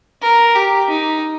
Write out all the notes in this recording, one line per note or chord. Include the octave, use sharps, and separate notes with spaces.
A#4
G4
D#4